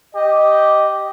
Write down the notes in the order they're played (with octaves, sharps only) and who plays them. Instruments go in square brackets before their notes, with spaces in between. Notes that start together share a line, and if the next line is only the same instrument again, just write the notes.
[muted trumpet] G4 [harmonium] D#5